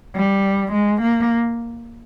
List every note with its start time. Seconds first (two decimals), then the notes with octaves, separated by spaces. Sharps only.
0.16 G3
0.72 G#3
1.01 A#3